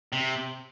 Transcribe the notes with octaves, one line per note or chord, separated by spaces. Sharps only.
C3